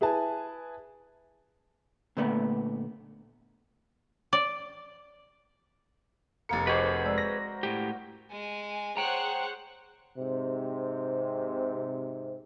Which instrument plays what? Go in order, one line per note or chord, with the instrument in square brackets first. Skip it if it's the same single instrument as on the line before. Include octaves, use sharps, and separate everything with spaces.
[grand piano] E4 G#4 B4 G#5 A5
[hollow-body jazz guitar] A#2 D3 A3 B3
[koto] D5
[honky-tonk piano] F1 C#7 [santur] A#3 A#4
[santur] F#4 C5 D6 [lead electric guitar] G#4 B4 [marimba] D#5
[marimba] G#3 D5 E6
[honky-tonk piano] A#6
[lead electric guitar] A2 G4
[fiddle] G#3 G#5
[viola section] G#4 C5 F#5 [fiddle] C#5 F#6 [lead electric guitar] G5 A#5
[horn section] G#2 C3